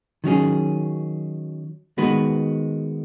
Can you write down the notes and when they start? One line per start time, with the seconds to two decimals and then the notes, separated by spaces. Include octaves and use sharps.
0.24 D#3 F#3 C#4 G#4
1.98 D#3 G#3 B3 F#4 B4